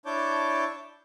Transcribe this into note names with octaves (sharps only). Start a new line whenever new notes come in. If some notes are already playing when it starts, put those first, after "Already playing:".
D4 E4 C#5 A5 D6 G6